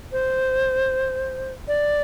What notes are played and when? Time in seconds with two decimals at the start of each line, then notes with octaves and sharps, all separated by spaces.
0.12 C5
1.68 D5